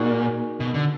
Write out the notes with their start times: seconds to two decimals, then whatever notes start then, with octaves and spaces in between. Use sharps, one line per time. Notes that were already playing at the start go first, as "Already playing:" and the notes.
Already playing: A#2 D#4 F#4 G#4 A#4
0.60 B2
0.74 D3